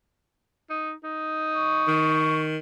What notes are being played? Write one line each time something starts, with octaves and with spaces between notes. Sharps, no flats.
D#4
D#4
C#6
D#3